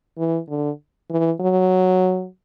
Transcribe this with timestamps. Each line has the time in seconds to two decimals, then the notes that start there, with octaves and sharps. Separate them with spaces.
0.17 E3
0.49 D3
1.10 E3
1.40 F#3